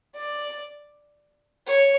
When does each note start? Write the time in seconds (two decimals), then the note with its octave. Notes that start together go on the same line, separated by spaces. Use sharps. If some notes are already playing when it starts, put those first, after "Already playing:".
0.15 D5
1.66 C#5